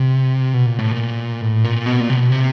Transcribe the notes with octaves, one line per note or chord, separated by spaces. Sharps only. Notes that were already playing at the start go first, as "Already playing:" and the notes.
Already playing: C3
B2
A#2
A2
A#2
A2
A#2
B2
A#2
C3
B2
C3